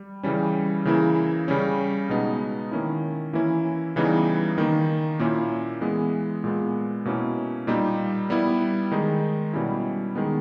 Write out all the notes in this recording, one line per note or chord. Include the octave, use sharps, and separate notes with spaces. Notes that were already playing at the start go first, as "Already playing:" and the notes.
Already playing: G3
C#3 E3 G3 C#4
C#3 E3 A#3 E4
C#3 G3 C#4
B2 G#3 B3 D#4
D#3 A#3 C#4 E4
E3 A#3 C#4 E4
C#3 E3 G3 B3 D#4
D#3 A#3 D#4
A#2 A#3 C#4 E4
E3 G#3 B3
A#2 G#3 B3
B2 A#3 C#4 E4
A#2 G3 A#3 D#4
G3 B3 E4
D#3 G#3 D#4
B2 G3 C#4 E4
D#3 G#3 B3